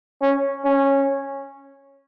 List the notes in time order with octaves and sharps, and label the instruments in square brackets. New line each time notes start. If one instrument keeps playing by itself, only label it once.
[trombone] C#4
C#4